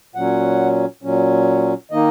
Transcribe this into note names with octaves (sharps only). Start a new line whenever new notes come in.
A#2 F#3 C#4 F#5
A#2 F#3 C#4
D#3 A#3 D#4 D#5